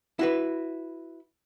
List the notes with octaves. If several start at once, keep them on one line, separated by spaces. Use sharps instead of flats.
E4 F#4 B4